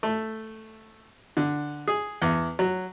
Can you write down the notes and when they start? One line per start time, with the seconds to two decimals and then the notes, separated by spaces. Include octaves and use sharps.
0.03 A3
1.37 D3
1.88 G#4
2.22 E2
2.59 F#3